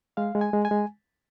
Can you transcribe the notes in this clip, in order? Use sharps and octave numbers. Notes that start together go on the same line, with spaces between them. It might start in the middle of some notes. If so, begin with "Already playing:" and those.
G#3 F5
G#3
G#5
G#3
G#5
G#3